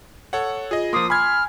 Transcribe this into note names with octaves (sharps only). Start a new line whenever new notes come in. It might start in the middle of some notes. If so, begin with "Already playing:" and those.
A4 C#5 F#5
F4 G#4 D#5
F3 A#3 C6 D6 D#6 C7
G#5 B5 F6 G#6